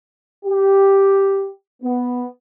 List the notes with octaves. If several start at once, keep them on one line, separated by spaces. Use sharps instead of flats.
G4
B3